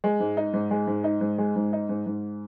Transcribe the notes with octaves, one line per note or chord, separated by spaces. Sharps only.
G#3
G#2
D#4
G#2
G#3
G#2
D#4
G#2
G#3
G#2
D#4
G#2
G#2